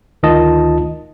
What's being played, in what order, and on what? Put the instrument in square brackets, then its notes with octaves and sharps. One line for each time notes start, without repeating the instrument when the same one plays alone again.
[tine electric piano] D2 D#3 F4 D#5 A5